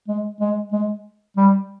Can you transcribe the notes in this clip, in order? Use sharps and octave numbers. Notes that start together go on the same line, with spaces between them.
G#3
G#3
G#3
G3